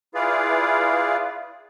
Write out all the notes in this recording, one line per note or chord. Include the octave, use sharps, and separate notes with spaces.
E4 F4 G#4 B4 D5 F5